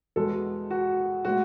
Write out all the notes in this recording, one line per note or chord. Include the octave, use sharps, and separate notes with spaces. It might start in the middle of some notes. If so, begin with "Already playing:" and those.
E2 B2 G#3 A4
F#4
A2 G#3 F#4